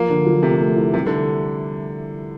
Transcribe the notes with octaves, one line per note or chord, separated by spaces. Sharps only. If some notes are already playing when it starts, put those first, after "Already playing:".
Already playing: F3 A#3
D3
F3
C3 A3
A3
E4
C3 G3
D3